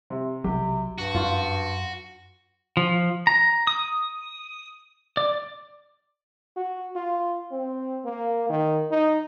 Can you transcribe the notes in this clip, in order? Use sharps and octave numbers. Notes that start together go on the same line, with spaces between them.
C3
B1 C3 F#3 G4
G2 F#4
F#2 F4 C#6
F3
A#5
D#6
D5
F#4
F4
C4
A#3
D#3
D#4